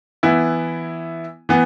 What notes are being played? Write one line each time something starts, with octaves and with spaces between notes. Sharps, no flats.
E3 B3 E4
E3 B3